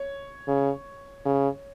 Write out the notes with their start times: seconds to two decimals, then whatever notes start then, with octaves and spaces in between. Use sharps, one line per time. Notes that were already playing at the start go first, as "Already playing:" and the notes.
Already playing: C#5
0.48 C#3
1.25 C#3